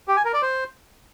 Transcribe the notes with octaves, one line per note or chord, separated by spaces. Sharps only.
G4
G#5
A#4
D5
C5